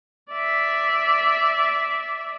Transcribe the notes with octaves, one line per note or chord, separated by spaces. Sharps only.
D5 E5